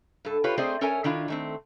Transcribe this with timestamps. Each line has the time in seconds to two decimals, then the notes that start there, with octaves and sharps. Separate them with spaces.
0.25 G2 A4
0.44 F4 G4 B4 C#5
0.58 A3 C4 G#4 C5 D5 D#5
0.81 C#4 A4 A#4 C#5 E5 G#5
1.04 D#3 D4 E4 F4
1.28 D#3 A3 C4